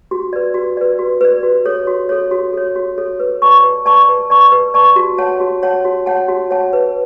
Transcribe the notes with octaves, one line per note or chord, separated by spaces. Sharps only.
F#4
B4 D5
F#4
B4 D5
F#4
B4 D5
F#4
A4 C#5
F#4
A4 C#5
F#4
A4 C#5
F#4
A4 C#5
B4
D5 A5 C#6
B4
D5 A5 C#6
B4
D5 A5 C#6
B4
D5 A5 C#6
F#4
C#5 F#5 A5
F#4
C#5 F#5 A5
F#4
C#5 F#5 A5
F#4
C#5 F#5 A5
B4